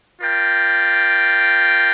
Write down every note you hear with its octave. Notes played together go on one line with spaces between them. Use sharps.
F4 A#4 D5 G5